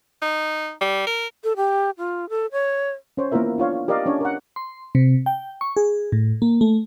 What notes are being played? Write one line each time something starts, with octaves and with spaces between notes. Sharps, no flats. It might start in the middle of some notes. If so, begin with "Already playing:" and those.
D#4
G3
A#4
A4
G4
F4
A4
C#5
C#4 C5 C#5
A#3 B3 E4 F4 A#4 E5
D4 F4 C#5 F5
G4 A#4 D5 D#5 F5
C#4 D4 C#5
A#4 F#5
C6
C3
G5
C#6
G#4
A2
A#3
A3